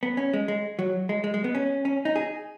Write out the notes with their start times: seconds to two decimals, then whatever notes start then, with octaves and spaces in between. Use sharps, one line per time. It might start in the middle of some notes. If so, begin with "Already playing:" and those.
0.03 B3
0.17 C#4
0.33 G#3
0.48 G#3
0.79 F#3
1.09 G#3
1.24 G#3
1.34 G#3
1.44 B3
1.55 C#4
1.85 C#4
2.05 D#4
2.16 G#4